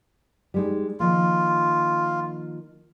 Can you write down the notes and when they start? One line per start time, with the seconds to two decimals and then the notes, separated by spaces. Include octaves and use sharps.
0.54 G3 G#3 D#4
1.00 D#3 F3 A#3 F4